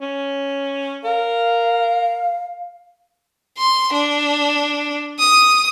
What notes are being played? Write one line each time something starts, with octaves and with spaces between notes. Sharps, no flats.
C#4
A#4 F5
C6
D4
D#6